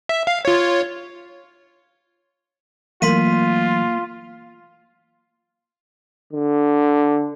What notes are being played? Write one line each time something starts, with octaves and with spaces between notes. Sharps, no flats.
E5
F5
F4 C#5
E3 F#3 A3 A#3 F4 C6 B6 D#7
D3